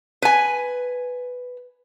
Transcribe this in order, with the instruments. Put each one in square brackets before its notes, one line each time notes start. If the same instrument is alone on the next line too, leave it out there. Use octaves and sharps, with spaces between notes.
[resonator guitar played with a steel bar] B4 G#5